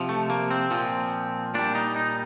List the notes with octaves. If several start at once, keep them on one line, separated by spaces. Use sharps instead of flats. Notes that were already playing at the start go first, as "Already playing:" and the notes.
Already playing: C3 F3
A3
A#3
C4
A#2 F3
A#2 G3 D4
D#4
D#4